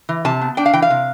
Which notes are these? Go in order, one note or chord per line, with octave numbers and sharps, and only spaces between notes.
E3
C3 A5
B3
D4 G5
F5
E3 G5
F5
C3